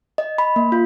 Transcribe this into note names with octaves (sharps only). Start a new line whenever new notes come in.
D#5
B5
A#3
F4